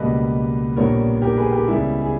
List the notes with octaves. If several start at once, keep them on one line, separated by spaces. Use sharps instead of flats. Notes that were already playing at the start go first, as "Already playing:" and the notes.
Already playing: C#2 B2 G3 A#3 B4 D#5
A#1 A#2 G3 B3 A#4 C#5
G4 A#4
G#4 B4
G4 A#4
C#2 C#3 G3 B3 E4 G#4
G#4